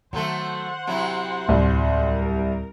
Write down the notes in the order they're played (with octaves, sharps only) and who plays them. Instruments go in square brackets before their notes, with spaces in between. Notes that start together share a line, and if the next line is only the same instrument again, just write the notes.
[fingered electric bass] D#3 [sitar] F#3 A3 A4 [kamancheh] C5 F#5
[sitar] C3 F#3 E4
[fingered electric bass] D1 [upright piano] C2
[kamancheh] A#4